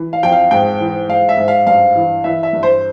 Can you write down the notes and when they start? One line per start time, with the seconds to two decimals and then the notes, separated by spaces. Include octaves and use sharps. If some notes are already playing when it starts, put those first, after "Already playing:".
Already playing: E3
0.13 F5
0.23 F2 G5
0.32 F5
0.51 G#2 G5
0.80 E3
1.09 G#2 F5
1.29 E5
1.37 G#2
1.48 F5
1.67 G2 F5
1.96 E3
2.24 E3 E5
2.43 E5
2.53 G2
2.63 C5